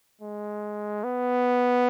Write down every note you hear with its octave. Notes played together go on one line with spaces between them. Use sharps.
G#3
B3